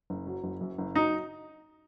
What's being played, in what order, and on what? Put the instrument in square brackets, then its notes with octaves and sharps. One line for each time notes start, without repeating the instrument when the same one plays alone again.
[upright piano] F#1
F#3
F#1
F#2
F#1
F#3 D#4